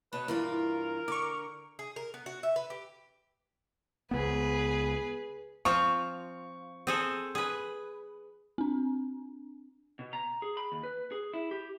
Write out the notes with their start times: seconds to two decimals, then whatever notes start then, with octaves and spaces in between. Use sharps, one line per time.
0.12 B2 B4 C#5 A5
0.28 G2 E3 F4 A#4
1.08 D3 C#6 D6
1.79 G#4
1.96 A#4
2.14 B3
2.26 F#4
2.43 E5
2.56 B4
2.70 G4
4.11 C#2 B3 G#4 B4
5.65 F3 C4 F4 C#6
6.87 C4 G#4 A4
7.35 G#4 B4
8.58 C4 D4
9.99 B2
10.13 A#5
10.42 G#4
10.57 B5
10.72 D#2
10.83 B4
11.12 G#4
11.34 E4
11.51 G4